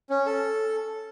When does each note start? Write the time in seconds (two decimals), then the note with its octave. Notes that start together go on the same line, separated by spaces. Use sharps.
0.10 C#4
0.26 A4